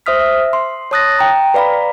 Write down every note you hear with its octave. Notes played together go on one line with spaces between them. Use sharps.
C5 E5 D#6 F6 B6
E5
C6
C#5 A5 D#6 F#6 A6 A#6
G5 A#5
B4 D5 F5 A#5 B5